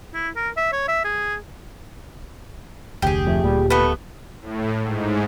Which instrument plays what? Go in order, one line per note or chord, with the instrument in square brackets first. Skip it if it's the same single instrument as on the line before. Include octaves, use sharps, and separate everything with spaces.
[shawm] E4
A#4
E5
C#5
E5
G#4
[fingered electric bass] F1 D2 [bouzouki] G4 G#4
[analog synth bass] F2 [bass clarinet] A3
[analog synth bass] D1 [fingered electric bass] A#2 [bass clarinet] G3
[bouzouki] A3 B3 [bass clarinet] B4
[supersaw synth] A2
G#2